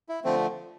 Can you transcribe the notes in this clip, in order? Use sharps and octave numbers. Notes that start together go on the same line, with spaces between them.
E4
D3 F3 A3 C4